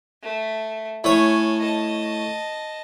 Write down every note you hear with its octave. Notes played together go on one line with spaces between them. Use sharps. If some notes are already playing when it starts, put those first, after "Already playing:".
A3
A2 A4 C#5 G#5
D#5 A5